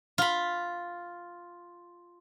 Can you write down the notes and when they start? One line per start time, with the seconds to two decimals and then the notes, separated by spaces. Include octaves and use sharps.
0.18 F4 B5